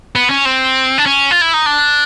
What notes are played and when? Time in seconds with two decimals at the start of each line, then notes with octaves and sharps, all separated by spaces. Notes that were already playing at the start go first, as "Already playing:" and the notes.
0.15 B3
0.30 C#4
0.45 C4
0.98 D4
1.06 C#4
1.31 F4
1.41 E4
1.54 D#4
1.66 D4